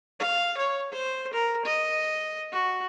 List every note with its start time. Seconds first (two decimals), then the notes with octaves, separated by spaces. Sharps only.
0.20 F5
0.57 C#5
0.92 C5
1.33 A#4
1.65 D#5
2.52 F#4